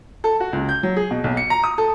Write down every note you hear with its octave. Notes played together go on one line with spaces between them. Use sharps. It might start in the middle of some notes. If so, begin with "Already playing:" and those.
A4
F#4
C#2
G6
F#3
G#4
B2
B1
C#7
A#5
D#6
A4